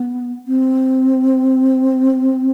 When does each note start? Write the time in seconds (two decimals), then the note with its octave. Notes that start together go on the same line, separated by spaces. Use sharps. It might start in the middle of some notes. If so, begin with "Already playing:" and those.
Already playing: B3
0.48 C4